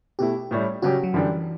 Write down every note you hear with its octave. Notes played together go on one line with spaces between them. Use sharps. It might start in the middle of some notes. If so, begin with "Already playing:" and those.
B2 A3 E4 G4
A2 G3 C#4 E4
C#3 F#3 C#4 F#4 G4
F#3
F#2 D3 E3 G3 D4 G4